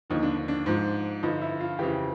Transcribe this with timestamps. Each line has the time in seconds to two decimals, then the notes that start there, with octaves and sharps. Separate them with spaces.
0.10 D#2 D3 F3 D#4
0.23 D4
0.48 D4
0.66 G#2 F3
1.23 G2 D3 F3 D#4
1.41 E4
1.60 F4
1.79 F2 C#3 E3 G4